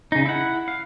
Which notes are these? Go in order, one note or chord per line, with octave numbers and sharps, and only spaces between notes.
C#3 D#4
E4 F#5
F5